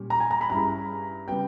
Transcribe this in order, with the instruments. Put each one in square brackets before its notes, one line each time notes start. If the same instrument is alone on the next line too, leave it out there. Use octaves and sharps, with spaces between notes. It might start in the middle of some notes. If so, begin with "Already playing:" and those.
Already playing: [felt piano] A#2 G3 C#4 G4
[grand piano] A#5
G#5
A#5
B5
[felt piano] G2 G3 C#4 E4 G#4 [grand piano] A#5
[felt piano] C#3 G3 B3 [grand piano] G5